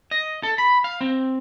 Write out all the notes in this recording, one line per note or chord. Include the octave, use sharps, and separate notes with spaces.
D#5
A4
B5
F5
C4